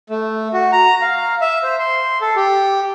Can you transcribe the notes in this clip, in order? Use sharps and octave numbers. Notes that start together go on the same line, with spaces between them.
A3
F#4
A#5
F5
E5
C5
C6
A4
G4